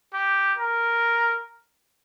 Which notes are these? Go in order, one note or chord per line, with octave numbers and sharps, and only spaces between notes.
G4
A#4